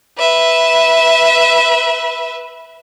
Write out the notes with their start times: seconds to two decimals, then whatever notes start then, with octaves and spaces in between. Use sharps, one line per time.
0.18 B4 E5